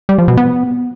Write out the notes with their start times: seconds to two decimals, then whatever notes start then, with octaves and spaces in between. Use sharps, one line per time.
0.09 G3
0.18 F3
0.28 B2
0.37 B3